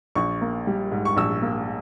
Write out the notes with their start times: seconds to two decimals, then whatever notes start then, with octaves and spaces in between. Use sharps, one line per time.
0.15 A#1 C#6
0.41 A#3
0.67 G3
0.92 G#2
1.05 C#6
1.17 A#1 E6
1.42 A#3